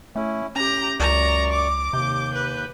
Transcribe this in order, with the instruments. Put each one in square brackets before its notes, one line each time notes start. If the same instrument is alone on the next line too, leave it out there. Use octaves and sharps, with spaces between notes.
[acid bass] A3 [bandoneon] C#4 E4
[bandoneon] A2 [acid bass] C#4 [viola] G4 A#5
[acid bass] C#2 [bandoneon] F#2 D5 C#6 [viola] A#5
[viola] D6
[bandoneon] D#2 G6 [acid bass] C3
[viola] B4